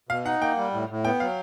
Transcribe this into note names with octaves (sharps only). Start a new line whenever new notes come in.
B2 F5
D#4 F#5
A#3 G5
G3
A2
A2
B3 G5
F#3 F5